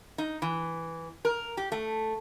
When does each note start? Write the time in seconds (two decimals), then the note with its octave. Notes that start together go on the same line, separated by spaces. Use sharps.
0.18 D#4
0.42 E3
1.25 A#4
1.57 G4
1.72 A3